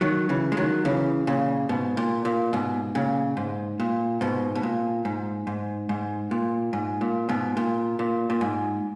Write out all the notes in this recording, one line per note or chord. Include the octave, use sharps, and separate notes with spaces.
D#3 F#3
C#3 E3
G#3
D#3 F#3
C#3 E3
A#2 C#3
G#2 B2
A#2
A#2
G#2 B2
A#2 C#3
G#2
A#2
G#2 B2
B2
A#2
G#2
G#2
G#2
A#2
G#2
A#2
G#2 B2
A#2
A#2
A#2
G#2